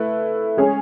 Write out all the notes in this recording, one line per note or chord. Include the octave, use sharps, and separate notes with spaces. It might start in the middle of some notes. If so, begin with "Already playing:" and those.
Already playing: A3 E4 B4
G#3 C#4 G#4 C#5